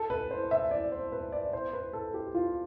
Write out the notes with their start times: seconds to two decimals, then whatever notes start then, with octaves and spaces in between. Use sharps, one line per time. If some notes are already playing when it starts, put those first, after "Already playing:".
Already playing: A4
0.10 B4
0.31 C5
0.51 E5
0.71 D5
0.92 C5
1.12 B4
1.32 D5
1.53 C5
1.73 B4
1.93 A4
2.14 G4
2.35 F4